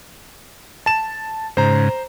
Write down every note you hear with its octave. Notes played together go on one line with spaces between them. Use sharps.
A5 E7
G#2 C#3 C5 A#5